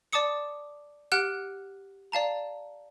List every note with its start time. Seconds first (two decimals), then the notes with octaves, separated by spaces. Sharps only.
0.13 D5 A5 D6 D#6 C#7
1.12 G4 F#5 F6 F#6 D7
2.12 D5 F5 A5 A#5